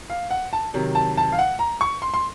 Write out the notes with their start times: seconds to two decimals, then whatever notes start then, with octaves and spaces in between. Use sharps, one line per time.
0.10 F5
0.31 F#5
0.53 A5
0.74 C3 D#3 F#3
0.95 A5
1.17 A5
1.32 F5
1.39 F#5
1.59 A#5
1.81 C#6
2.02 C6
2.14 C6